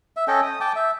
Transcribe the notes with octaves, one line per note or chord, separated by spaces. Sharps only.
E5
C#4 A4 D#5 G5
D#6
G5 A5 D6
E5